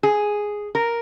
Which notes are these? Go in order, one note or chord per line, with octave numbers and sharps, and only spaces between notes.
G#4
A#4